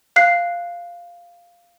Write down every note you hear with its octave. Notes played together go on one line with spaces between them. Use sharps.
F5 F#6 C7